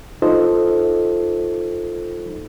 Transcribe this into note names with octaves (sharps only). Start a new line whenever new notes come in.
D#4 F4 A4 C5 D#5